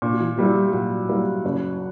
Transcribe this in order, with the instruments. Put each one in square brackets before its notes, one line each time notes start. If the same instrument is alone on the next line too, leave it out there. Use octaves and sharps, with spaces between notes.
[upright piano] A#2 [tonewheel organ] D4
[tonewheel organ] F#4
E3 E4
[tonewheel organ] F#3 F#4 [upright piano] G3 A#3 E4
[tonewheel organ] G3 G4
[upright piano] A#2 [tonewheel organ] F#3 F#4
[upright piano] G3 A#3 E4
F#1